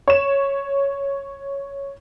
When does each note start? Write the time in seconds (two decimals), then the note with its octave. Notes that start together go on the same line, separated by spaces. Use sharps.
0.08 C#5 E7